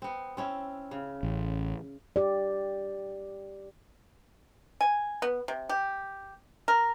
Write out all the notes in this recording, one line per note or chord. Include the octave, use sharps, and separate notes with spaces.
B3 C4
C4 C#4 E4
C#3
A1
G4 D5
G#5
B3
C3
G4
A#4